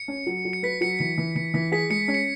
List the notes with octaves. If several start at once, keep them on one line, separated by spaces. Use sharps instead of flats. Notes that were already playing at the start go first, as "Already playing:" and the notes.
Already playing: C#7
C#4
F#3
F#3
C#7
B4 B6
F#3 C#7
E3 C#7
E3
E3 C#7
E3 B6
G#4 B6
G#3 C#7
C#4
C#7